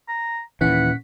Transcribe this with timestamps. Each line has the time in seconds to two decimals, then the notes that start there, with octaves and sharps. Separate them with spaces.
0.08 A#5
0.61 D#2 A#2 E3 C#4 F#5 B6